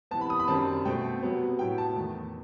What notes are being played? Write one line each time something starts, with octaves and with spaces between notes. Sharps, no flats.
C3 E3 B3 A5
B5
D#6
B5
F#2 D#3 G3 C4 A5
B2 A3 C4 G5
C3 F#3 B3
A2 F#3 B3 G5
A5
E2 D#3 A3